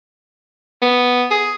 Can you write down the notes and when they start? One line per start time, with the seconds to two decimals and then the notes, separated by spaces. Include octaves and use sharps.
0.82 B3
1.31 G#4